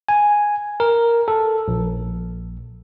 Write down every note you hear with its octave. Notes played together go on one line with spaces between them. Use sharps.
G#5
A#4
A4
A#1